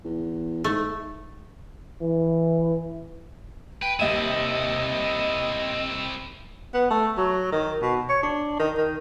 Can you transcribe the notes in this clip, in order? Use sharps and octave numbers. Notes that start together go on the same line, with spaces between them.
E2
G#2 A3
E3
B4 G5
D#2 C4 E4 D#5 E5 D#7
B3
A3
F#3
D#3
B2
C#5
D4
D#3
D#3